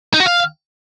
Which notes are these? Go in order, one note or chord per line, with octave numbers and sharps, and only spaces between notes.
D#4
F#4
F5